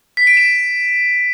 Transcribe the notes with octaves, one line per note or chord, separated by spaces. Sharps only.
B6
D7
E7